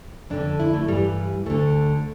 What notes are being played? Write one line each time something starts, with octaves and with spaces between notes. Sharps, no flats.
F2 D3 D4
E4
A3
G2 E3 G3
D2 D3 A3